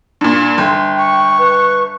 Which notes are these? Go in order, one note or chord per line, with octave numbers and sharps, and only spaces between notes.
G2 A#2
G1 G5 C6
C#6
B4